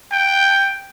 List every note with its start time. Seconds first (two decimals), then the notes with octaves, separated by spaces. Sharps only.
0.12 G5